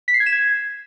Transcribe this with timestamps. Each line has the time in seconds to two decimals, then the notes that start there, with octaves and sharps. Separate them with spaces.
0.08 B6
0.14 C7
0.20 G#6
0.26 E7
0.32 G#6